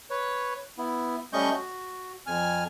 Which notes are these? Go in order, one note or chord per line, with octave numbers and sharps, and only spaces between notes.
B4 C#5
B3 E4
G3 A3 C#4 D#5 C#6 G6
F#4
F2 G#5 F6